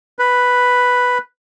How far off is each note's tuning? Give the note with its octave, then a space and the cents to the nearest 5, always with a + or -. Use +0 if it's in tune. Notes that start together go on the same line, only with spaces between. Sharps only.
B4 +0